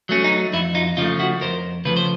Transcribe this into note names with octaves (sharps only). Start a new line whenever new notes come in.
F#3 A3 C#4
D#4
F2 E4
D#4 F4
C#3 F3 A3 D#4 F4
E4 F#4
F2 A#4 C5
C#3 F3 A3 B4
C5